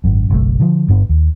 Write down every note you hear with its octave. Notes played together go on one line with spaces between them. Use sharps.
G#1 F#2
F#1 B1 A2 A3
D3 F3
G1 G2 B3 D4
D#2